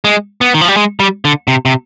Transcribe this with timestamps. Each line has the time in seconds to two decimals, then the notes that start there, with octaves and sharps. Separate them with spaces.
0.05 G#3
0.41 B3
0.54 D#3
0.61 F3
0.68 G3
0.77 G#3
1.00 G3
1.25 D3
1.48 C3
1.65 C3